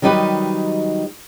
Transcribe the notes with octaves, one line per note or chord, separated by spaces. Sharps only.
D#3 F#3 G3 D#4 G4 B4